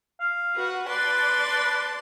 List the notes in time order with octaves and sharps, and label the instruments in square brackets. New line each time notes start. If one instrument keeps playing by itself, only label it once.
[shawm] F5
[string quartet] F#4 B4 F#5
[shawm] B4 [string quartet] D5 A5 C6